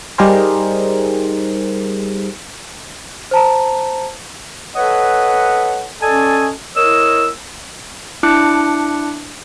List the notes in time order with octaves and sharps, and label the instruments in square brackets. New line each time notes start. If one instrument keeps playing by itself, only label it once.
[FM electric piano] G3 D#4 G4 G#4 A#4 C5
[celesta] C5 A5 A#5
[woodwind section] A4 B4 C#5 D#5 F#5
C#4 A4 D5 D#5 G#5 A5
E4 A#4 C#5 D#5 E6
[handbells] D4 E4 A5 D6 F#6 C#7